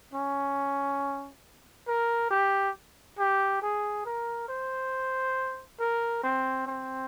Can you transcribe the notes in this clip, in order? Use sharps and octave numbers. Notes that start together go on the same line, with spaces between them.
C#4
A#4
G4
G4
G#4
A#4
C5
A#4
C4
C4